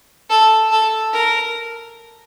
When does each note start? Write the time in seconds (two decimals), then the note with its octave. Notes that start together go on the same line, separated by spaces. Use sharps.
0.30 A4
0.71 A4
1.13 A#4